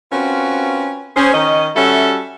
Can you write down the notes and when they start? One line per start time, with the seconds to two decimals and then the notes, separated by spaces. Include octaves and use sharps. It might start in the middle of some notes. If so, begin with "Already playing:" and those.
0.12 C4 C#4 F4 F#4 A#4 B4
1.16 C#4 G#4 C5
1.33 D#3 C#4 D#5
1.76 G3 C#4 F#4 A4 E5